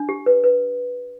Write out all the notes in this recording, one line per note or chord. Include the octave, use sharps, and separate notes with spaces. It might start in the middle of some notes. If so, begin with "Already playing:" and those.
Already playing: D4
G4
B4
B4